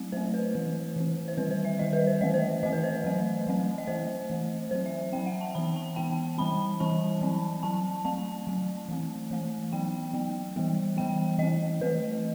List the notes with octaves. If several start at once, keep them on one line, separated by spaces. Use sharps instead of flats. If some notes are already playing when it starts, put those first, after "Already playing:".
Already playing: F#3 A3 C4
F#3 A3 C4 C5
B4
E3 A3 C4
E3 A3 C4
C5
D#3 G3 C4 B4
C5
E5
D#3 G3 C4 D#5
B4
C5
E3 A3 C4 D#5
C5
E3 A3 C4 D#5
B4
C5
F#3 A3 C4
F#3 A3 C4
D#5
E3 A3 C4 C5
E3 A3 C4
F#3 C4 C5
E5
F#3 C4 G5
F#5
A5
E3 B3 B5
A5
E3 B3 G5
E3 G3 C4 B5
E3 G3 C4 A5
F#3 C4
F#3 C4 A5
F#3 A3 C4 A5
F#3 A3 C4
E3 A3 C4
E3 A3 C4
F#3 B3 G5
F#3 B3
E3 G3 B3
E3 G3 B3 G5
E3 A3 C4 D#5
E3 A3 C4 B4